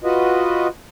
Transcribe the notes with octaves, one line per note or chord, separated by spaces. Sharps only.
F4 F#4 B4 D#5